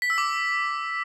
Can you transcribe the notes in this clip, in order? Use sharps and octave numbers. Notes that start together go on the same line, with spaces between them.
B6
E6
D6